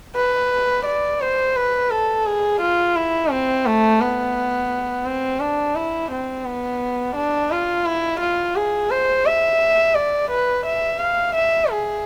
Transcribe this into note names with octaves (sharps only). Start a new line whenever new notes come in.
B4
D5
C5
B4
A4
G#4
F4
E4
C4
A3
B3
C4
D4
E4
C4
B3
D4
F4
E4
F4
G#4
C5
E5
D5
B4
E5
F5
E5
G#4